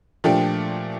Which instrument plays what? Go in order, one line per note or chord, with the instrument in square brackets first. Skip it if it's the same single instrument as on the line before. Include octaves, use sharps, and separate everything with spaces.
[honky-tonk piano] A#2 F3 A3 D4 G4